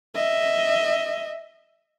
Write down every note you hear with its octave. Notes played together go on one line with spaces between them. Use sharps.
D#5 E5